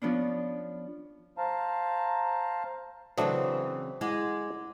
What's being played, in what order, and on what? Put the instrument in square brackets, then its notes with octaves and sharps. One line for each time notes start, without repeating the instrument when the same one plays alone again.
[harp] F3 B3 C#4 D4
[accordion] C5 F5 A5 A#5
[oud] C#3 E3 C4 [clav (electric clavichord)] F#3 A3 D4 [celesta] D#6
[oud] G#3 [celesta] E4 F#5 D6